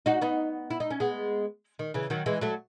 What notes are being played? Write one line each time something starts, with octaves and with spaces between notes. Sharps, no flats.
D#4 F#4
B3 D#4
E4
D#4
C#4
G#3 B3
D#3
C#3 E3
D#3 F#3
E3 G#3
F#3 A3